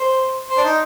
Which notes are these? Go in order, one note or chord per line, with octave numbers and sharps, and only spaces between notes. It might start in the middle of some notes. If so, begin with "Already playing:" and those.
Already playing: C5
C5
D4
D#4